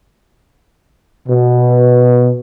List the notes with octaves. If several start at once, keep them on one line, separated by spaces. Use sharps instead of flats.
B2